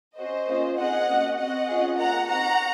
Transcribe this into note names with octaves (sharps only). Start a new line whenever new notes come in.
C#4 F#4 C5 D#5
A#3 C#4 F4 G#4
C4 D#4 G#4 D#5 F#5
A#3 C#4 F#4
C4 F#4 D#5 F#5
C#4 F4 G#4
A#3 F4 G#4 F#5 A#5
C4 D#4 F#4 F#5 A#5